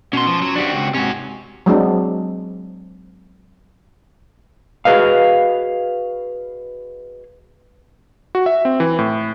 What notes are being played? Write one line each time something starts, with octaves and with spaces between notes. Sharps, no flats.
B2 C#4 C6
F3
F#3
C4 D4 F#4 G4
C#2
G#2 C3 C#4 F#4
F#3 G#3 C4 D4
F#4 G#4 B4 D#5 F5
F#4
E5
C4
E3
A2